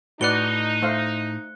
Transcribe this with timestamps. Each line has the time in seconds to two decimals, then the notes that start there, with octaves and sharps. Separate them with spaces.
0.21 A2 D#4 F#4 B4 D5 F#6 C#7 G7
0.82 A3 C5 F5